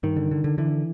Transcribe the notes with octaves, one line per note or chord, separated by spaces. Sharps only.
G2 D#3
D3
D3
D3
D3 E3